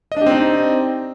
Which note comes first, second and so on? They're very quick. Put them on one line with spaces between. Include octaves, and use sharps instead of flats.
D#5 D4 G4 C4 D#4